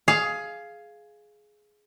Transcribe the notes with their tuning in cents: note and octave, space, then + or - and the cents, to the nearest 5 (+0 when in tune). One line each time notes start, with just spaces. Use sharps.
G#4 +15 F5 -5